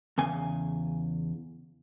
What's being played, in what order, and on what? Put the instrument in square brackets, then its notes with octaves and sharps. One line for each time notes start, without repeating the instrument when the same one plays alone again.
[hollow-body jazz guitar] E2 C#3 G#5